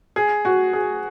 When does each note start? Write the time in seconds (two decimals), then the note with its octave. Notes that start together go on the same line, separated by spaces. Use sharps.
0.16 G#4
0.45 F#4
0.73 G#4